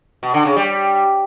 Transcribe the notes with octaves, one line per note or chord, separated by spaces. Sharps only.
B2
D3
C#3
G3